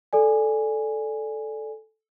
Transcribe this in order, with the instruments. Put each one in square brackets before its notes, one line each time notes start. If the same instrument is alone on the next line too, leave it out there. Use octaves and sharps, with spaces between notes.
[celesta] A4 D5 G#5